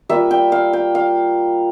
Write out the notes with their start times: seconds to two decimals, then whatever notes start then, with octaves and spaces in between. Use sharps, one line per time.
0.09 G3 A#3 F4 E5
0.31 G5
0.52 F5
0.73 G5
0.95 F5